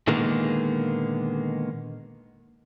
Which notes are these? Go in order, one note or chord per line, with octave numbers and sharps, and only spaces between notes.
A#2 D3 D#3 G#3 A#3 B3